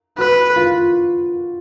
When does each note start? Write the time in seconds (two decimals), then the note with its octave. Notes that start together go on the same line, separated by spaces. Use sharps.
0.18 F#4 B4
0.56 F4